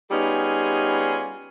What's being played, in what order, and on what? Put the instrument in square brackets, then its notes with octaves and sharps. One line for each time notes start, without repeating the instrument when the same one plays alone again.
[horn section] G3 B3 C#4 D#4 F4 G#4